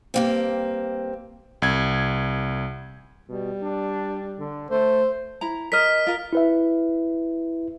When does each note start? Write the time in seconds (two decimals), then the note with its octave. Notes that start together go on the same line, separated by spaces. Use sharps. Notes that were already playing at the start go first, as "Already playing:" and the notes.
0.14 G2 A#3 C4
1.62 C2 G#6
3.29 B2 G3
3.63 D4
4.39 D3
4.71 A3 C5
5.41 E4 A#5
5.72 A#4 D#5 F6 B6
6.07 F4 A#4
6.33 E4 B4 E5